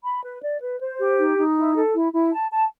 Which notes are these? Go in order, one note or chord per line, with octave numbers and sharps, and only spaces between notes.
B5
B4
D5
B4
C5
G4
D#4
D#4
E4
A4
E4
E4
A5
A5